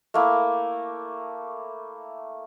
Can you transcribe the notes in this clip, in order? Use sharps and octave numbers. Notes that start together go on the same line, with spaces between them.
A3 A#3 E4